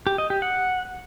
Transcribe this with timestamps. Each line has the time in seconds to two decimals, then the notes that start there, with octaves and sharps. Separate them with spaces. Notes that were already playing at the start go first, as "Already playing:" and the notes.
0.07 G4
0.18 D#5
0.30 G4
0.42 F#5